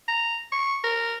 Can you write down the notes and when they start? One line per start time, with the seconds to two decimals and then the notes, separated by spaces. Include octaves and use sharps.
0.08 A#5
0.52 C#6
0.83 A#4